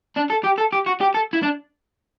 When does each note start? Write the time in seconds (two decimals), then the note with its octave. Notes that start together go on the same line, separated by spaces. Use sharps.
0.16 D4
0.30 A4
0.44 G4
0.58 A4
0.73 G4
0.86 F#4
1.01 G4
1.14 A4
1.33 E4
1.43 D4